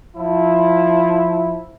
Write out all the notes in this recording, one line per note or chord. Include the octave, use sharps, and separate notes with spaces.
F3 E4